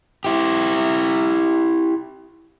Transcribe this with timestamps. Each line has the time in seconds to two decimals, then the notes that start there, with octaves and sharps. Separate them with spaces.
0.25 E4 G4